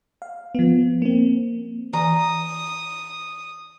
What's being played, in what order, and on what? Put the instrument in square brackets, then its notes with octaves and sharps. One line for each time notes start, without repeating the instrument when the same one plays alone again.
[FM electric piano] F5
F3 B3
A#3 C4
[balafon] E3 D5 G#5 [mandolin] A#5 [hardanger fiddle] D#6